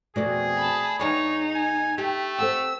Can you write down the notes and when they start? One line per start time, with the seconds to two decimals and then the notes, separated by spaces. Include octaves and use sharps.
0.16 F2 B2 A3 G#4 D5
0.57 A5 B5
1.00 E2 D#4 G#4 C#5 F5
1.55 G#5
1.98 A3 G4
2.38 C4 A4 F#5 E6